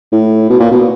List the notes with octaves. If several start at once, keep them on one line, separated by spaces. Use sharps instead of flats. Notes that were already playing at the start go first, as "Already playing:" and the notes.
A2
B2
A#2
B2